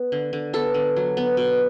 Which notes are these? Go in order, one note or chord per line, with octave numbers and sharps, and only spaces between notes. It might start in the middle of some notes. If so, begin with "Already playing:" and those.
Already playing: B3
D3
D3
B3 A4
D3
F#3
B3
B2